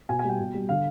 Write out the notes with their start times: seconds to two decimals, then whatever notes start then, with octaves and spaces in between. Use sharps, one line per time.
0.09 B2 G#5
0.19 G#5
0.24 G3 G5
0.39 B2
0.54 G3
0.69 D3 F5